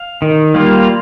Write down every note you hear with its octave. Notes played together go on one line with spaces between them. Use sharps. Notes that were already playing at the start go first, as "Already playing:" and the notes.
Already playing: F5
D#3
G3 A#3 F4